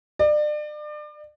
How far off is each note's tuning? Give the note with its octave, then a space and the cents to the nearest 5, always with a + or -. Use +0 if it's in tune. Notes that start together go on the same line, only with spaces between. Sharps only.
D5 +35